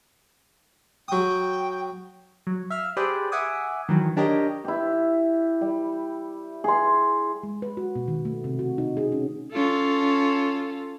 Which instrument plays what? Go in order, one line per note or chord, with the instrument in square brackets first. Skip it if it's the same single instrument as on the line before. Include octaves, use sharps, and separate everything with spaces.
[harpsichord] F#3 D#6 [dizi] G5
[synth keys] F#3
E5 F5 F6
G4 G#4 B4 C5 D5 G5
E5 F#5 G#5 D6 D#6
D#3 E3 F#3
D4 G4 A#4 C#5 D#5
[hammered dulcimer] E4 G4
G3
G#4 C6
[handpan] G#3
B4
F#4
B2
D#3
A3
C3
F#4
D#4
G#4
C#4
[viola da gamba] C#4 F4 A4